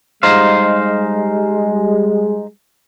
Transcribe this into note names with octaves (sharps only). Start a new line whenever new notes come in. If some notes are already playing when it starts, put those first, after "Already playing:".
G3 G#3 D#4 C5 F5